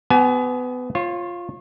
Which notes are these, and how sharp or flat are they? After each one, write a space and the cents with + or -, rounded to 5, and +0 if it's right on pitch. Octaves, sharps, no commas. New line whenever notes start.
B3 +20 G4 -15 G#5 +35
F4 +0 C#5 -30